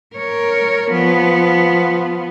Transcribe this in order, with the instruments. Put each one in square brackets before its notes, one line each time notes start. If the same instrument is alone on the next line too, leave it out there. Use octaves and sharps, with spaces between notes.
[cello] A#4 C#5
F3 B3